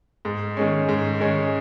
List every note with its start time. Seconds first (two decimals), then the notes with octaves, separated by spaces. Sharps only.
0.25 G#2
0.57 D#3 G#3 C#4
0.89 G#2
1.20 D#3 G#3 C#4